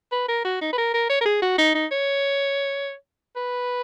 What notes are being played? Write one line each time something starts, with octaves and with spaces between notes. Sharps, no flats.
B4
A#4
F#4
D#4
B4
A#4
A#4
C#5
A#4
G#4
F#4
D#4
D#4
C#5
B4